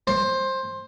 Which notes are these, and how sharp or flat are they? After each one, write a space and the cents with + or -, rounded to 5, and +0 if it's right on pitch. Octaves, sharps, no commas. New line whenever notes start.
C5 +15